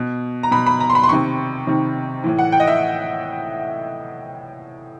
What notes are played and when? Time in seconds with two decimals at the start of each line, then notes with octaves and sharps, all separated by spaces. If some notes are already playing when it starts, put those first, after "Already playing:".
Already playing: B2
0.43 A#5
0.51 B2 B5
0.66 B5
0.80 A#5
0.90 C6
0.95 B5
1.04 C6
1.09 C3 D#3 C#6
1.67 C3 D#3
2.23 A2 E3
2.39 F#5
2.52 G5
2.60 D#5
2.67 E5